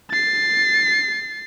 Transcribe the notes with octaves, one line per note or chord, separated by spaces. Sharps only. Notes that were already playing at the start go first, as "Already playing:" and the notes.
A6 C7